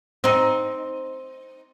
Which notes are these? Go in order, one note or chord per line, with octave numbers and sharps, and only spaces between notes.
C4 D#4